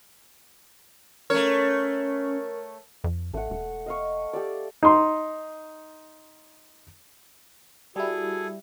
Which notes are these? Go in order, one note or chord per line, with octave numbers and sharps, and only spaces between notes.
A3 C#4 A#4 C#5
F2
A1 A3 F#5
E1
D#5 F5 C#6
G4 A4 D5
D#4 C6
G3 E4 F#4 G#4 A4